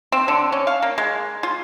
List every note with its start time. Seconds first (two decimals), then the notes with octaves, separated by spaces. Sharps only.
0.12 C4
0.28 D3
0.52 C#4
0.67 F5
0.82 A#3
0.98 G#3
1.43 F4